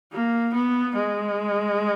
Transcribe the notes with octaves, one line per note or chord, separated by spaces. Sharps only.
A#3
B3
G#3